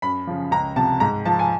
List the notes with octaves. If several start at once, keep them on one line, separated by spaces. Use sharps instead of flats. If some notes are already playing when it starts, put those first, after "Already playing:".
F#2 B5
C#3 F3
C#2 A#5
C3 F3 A5
G#2 A#5
F3 A5
G#5